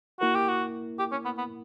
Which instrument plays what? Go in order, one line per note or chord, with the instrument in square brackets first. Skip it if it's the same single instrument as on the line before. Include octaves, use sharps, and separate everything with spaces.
[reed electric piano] A#3 E4 A#4 [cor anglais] F#4
[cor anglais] G4
F#4
G4
C#4
B3
B3